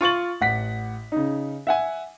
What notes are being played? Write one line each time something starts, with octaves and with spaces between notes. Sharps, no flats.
F4 C#6 A6 F#7
A1 F#5 B6
C#3 D#4
E5 F#5 G#5